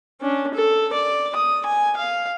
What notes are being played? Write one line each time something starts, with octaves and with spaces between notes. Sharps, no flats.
C#4 D4
A4
D5
D#6
G#5
F5